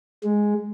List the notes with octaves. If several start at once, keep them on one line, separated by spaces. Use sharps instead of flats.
G#3